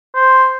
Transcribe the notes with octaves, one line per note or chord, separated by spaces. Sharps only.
C5